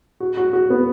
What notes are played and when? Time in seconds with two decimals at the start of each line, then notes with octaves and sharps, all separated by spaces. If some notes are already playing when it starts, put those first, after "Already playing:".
0.20 F#4
0.37 F#4
0.53 F#4
0.70 B3